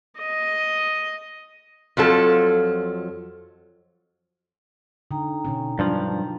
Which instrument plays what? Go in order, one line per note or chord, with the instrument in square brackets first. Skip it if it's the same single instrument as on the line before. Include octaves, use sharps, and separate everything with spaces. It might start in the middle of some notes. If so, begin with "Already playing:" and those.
[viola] D#5
[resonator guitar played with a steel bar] F2 F3 F#3 A4
[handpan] D3 [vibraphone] D#4 G5 A#5
[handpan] B2 D3 C#4
[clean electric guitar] G2 F3 [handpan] F#3 D4